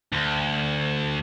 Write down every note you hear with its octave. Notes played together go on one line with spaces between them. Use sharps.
D2